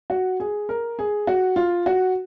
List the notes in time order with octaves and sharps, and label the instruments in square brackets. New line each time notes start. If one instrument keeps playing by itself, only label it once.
[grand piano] F#4
G#4
A#4
G#4
F#4
F4
F#4